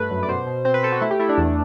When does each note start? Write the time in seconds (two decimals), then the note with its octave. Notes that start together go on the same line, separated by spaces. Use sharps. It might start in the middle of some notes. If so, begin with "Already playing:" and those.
Already playing: G2 A3 B4
0.10 F#2
0.23 D5
0.29 B2 C5
0.47 B2
0.65 C4 C5
0.74 B4
0.83 C4 A4
0.92 F#4
1.02 A3 E4
1.11 G4
1.19 A3 E4
1.29 D4
1.38 E2